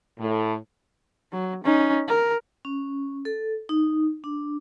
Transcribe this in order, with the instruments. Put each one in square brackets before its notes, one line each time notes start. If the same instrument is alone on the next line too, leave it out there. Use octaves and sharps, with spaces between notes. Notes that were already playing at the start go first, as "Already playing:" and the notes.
[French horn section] A2
[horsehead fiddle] F#3
C#4 D#4
A#4
[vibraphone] C#4
A4
D#4
D4